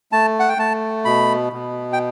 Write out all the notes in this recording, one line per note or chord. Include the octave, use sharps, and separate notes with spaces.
A3 A5
F#5
G5
A3 A5
B2 B5
B2
G5